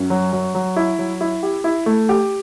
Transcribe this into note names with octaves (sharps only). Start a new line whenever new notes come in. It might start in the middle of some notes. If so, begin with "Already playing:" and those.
Already playing: F#2
F#3
F#3
F#3
E4
F#3
E4
G4
E4
A3
G4